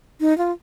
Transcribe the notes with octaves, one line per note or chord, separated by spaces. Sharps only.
D#4
F4